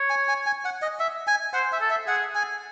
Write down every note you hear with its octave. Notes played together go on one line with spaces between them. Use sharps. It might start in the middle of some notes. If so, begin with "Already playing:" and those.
Already playing: C#5
G#5
G#5
G#5
F#5
D#5
E5
G#5
C5 F#5
E5
A4
E5
G#4 F#5
G#5